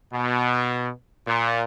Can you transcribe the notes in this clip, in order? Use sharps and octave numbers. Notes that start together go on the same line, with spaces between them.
B2
A#2